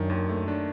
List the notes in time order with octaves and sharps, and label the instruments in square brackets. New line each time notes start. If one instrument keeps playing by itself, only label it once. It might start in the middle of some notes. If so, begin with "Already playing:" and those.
Already playing: [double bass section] F#2 [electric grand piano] D#3 D4
[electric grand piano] D#2
A3
D4